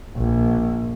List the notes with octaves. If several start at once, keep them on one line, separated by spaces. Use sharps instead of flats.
A#1